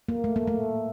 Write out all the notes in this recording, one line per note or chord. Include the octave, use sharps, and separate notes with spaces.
A#3
A3
A#3
A3